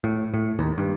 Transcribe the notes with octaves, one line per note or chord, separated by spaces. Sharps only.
A2
A2
D#2
G2